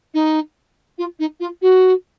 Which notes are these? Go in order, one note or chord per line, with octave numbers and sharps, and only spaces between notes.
D#4
F4
D#4
F4
F#4